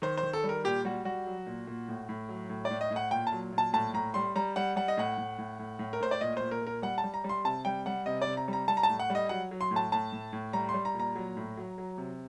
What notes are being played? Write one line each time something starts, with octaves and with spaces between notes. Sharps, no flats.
D#3 C5
C5
D#3
A4
G3
A#4
A#2 G4
G3 F#4
G3 F#4
F#3
A#2
A#2
A2
A2
F#3
A2
D5
A2
D#5
A2
F#5
A#2 G5
A5
F#3
A#2
A5
A2 A5
A2 A#5
G3 C6
G3 A#5
G3 F#5
G3 F#5
D#5
A2 F#5
A2
A2
A2
A2
A#4
A2 C5
D5
A#2 D#5
A#2 C5
A#4
A#2
A#4
G3 F#5
A5
G3
A#5
G3
C6
C3 A5
G3 G5
G3 F#5
C3 D#5
D5
C3
A#5
G3
A#5
G3 A5
A#5
A5
A2
F#5
G3
D#5
F#3 F#5
F#3
C6
A2
A5
A2 A5
A2
A2
G3 A#5
C6
G3
A#5
A#2
A#5
F#3
A2
F#3
F#3
C3